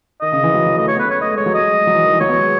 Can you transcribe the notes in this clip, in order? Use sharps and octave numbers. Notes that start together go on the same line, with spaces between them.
D#3 D#5
C#3
E3
F#3
F#3
A3 D#5
A3 C#5
B3
B4
C#4
C#5
A3 D#5
G#3 C#5
F#3
G#3 D#5
F#3
E3
D#3
E3
F#3 C#5
B3
G#3